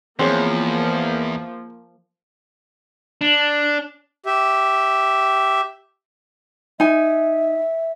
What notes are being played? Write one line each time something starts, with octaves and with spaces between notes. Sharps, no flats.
E2 F3 A#3 C4 G#4 C#5
D4
G4 E5
D#4 E5 G#5